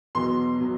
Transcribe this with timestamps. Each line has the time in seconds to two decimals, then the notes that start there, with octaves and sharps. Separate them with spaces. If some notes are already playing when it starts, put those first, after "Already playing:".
0.15 E2 B2 F#3 C6
0.60 B2 F#3